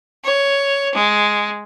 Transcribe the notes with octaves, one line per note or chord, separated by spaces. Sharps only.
C#5
G#3